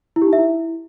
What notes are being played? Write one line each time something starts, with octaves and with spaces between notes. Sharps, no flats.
E4
G4
D#4
E5
E4